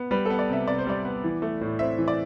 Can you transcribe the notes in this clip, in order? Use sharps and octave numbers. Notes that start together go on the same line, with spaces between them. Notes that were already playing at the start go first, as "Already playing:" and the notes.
Already playing: B3
G3 B4
A4
B3
D5
C3 E5
C3 D5
C5
G3 D5
B3
E3
A3
A2
C4 E5
E3
D5